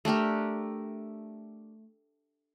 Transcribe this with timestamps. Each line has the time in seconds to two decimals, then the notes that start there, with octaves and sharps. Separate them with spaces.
0.05 A3 D4 G4 A#4